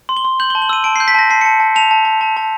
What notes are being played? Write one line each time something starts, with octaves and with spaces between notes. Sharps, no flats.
C6
G7
C6
G6 F#7
G7
A5
F#7
E6 D#7
A5 D7
C7
G6
B6
A5 A#6
A5 C7
C#7
A5
A5
A5 F7
A5
A5
A5
A5